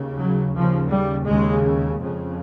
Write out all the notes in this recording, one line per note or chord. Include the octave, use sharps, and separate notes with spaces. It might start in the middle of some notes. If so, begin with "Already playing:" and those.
Already playing: D#2 C#3
F#3
D#2 C#3 F3
G3
D#2 C#3 G#3
F2 C#3